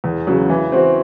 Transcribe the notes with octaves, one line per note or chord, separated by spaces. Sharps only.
E2
C#3 F#3
E3
C4 F#4